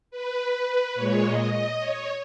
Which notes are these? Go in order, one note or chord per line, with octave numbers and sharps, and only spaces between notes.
B4
A#2 G#3 C#5
D#5
D#5
C#5